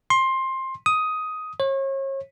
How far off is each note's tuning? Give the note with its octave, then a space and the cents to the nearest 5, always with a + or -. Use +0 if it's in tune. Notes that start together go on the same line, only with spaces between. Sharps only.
C6 +15
D#6 +10
C#5 -35